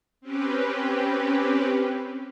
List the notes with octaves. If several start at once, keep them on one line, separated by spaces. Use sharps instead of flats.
C4 C#4 G4 B4